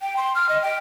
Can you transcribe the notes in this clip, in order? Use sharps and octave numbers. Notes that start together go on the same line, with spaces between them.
G5
C6
F6
D#5
G5